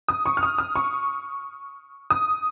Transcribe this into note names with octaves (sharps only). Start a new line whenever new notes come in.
D#6
C#6
F6
D#6
D#6
C#6
D#6